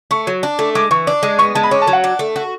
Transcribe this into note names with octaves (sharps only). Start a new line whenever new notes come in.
A3 C#6
F#3
D4
A3
G#3 D6
E3 C#6
D4
G#3
B3 C#6
G#3 A5
B5
C#4 D6
A5
F#3
F#5
D4
A3
F#4